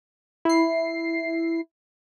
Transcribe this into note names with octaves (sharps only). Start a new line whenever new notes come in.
E4 C7